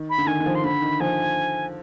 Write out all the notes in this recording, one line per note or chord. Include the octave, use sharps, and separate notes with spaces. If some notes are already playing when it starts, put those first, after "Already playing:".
Already playing: D#3
B5
D3
D#3 G#5
D#3
F3
C6
D3 B5
D#3
F3 G#5